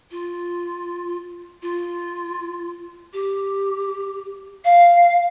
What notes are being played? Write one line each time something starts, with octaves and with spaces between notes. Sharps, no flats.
F4
F4
G4
F5